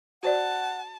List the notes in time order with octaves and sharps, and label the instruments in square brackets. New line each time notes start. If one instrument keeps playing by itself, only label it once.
[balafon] F#4 C5 D5 [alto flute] F#5 [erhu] A5